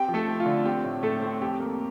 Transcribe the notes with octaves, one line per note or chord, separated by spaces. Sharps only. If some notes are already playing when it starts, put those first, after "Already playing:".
Already playing: C4 G4 G5
F3
A3 A4
C4
F4
D3
C4 G4
A2
A2 A3 A4
C4
F2 G4
A#3